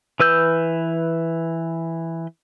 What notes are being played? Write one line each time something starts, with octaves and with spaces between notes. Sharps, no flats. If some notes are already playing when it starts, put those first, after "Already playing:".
E3 B4 E6 G6